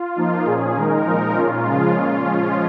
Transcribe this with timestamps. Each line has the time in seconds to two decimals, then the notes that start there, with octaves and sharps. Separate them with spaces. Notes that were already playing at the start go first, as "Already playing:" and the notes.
Already playing: F4
0.16 F3 A#3 D#4
0.46 A#2 F3 C#4 G#4
0.76 D#3 G#3 D#4 A#4
1.06 A#2 F3 G#3 D#4
1.35 A#2 A#3 C#4 F4
1.65 C#3 F3 G#3
1.95 A#2 G#3 C#4 F4
2.24 F3 G#3 C#4